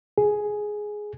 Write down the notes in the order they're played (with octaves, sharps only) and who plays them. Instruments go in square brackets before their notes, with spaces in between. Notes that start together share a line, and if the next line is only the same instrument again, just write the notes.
[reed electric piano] G#4